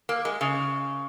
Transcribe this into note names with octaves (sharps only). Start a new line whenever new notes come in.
A#3
G#3
C#3